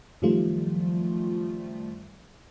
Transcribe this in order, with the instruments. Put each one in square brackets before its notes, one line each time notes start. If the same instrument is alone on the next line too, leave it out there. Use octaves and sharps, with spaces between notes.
[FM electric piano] F#2 D#3 F3 G3 A3 F4